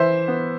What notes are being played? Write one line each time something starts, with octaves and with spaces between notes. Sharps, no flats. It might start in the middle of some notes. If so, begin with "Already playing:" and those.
Already playing: E3 C5 E5
B3